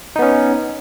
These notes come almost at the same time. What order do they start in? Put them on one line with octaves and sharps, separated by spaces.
D#4 B3 C#4